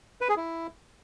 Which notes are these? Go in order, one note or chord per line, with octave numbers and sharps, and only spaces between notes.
B4
G#4
E4